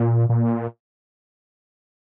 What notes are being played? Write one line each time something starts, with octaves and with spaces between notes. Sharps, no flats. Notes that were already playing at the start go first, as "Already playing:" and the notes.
Already playing: A#2
A#2